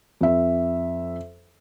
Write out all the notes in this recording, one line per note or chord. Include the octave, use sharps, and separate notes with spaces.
F2 E5